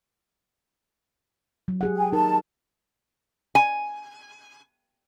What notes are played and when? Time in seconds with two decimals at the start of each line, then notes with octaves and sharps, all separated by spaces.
1.68 F#3
1.81 G4 G#4 F#5
1.97 G5 G#5
2.13 D#4 A#4 A5
3.55 G#5